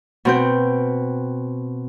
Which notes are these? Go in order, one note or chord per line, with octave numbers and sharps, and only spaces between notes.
B2 C4 G6